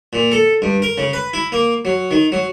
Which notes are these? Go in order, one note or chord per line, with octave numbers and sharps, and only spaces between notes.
A#2
A4
G2
A#4
C#3
B4
E4
A#3
F#3
D#3
F#3